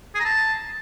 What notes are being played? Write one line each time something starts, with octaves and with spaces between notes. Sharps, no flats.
G#4
A#5
A5